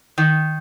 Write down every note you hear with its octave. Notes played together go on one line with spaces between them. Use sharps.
D#3